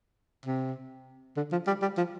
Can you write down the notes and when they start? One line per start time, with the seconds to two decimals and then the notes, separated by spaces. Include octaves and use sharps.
0.46 C3
1.37 D3
1.52 F3
1.67 G3
1.82 G3
1.97 F3